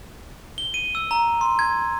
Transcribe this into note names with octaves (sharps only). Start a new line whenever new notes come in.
G7
D#7
E6
A#5
C6
G#6